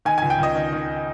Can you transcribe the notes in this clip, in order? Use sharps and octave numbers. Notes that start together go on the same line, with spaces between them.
D#3 G#5
G#5
C#2
G5
C#2 D#5
D#3
D#3